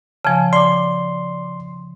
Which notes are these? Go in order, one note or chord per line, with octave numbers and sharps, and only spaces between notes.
C#3 F3 G#5 A5
D5 C6 D6